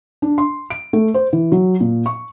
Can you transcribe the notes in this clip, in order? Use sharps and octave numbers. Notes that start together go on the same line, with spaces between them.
D4
C6
D7
A3
C5
E3
F#3
A#2
C#6